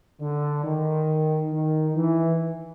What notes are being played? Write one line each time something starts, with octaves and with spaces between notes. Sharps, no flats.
D3
D#3
D#3
E3